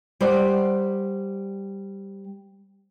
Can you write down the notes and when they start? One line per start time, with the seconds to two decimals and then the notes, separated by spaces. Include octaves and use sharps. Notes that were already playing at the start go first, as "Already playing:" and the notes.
0.20 G3 C5 D5 F#5